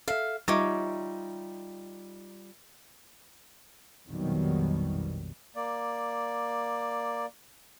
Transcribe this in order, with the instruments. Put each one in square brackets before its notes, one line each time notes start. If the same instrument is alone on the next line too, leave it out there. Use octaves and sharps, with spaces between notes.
[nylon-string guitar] A4 E5 [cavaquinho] F5
[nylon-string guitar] G3 F4 E5 [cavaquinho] D#4 C#5 D6
[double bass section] A#1 F2 B2 D#3 F#3 G3
[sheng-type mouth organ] A#3 D5